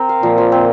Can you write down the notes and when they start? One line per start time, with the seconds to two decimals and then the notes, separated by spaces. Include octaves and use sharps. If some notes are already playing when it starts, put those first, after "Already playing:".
Already playing: C4 A#4
0.09 F5
0.23 A#2 F3
0.38 F3
0.52 C4